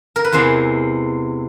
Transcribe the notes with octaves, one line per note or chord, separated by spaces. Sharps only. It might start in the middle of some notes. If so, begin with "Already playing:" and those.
A#4
B4
E2 C3 E3 G#3 C5